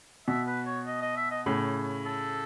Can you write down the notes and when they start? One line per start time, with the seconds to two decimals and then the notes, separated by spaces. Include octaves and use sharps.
0.28 B2 E5
0.47 B4
0.66 C#5
0.87 D#5
1.02 D#5
1.17 E5
1.31 D#5
1.46 A2 C#3
2.06 A4